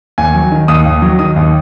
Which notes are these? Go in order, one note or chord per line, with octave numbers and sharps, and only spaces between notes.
D#2 G#5
F#3
D#3
D#2 D#6
D#2
F#3
D#3 D#6
D#2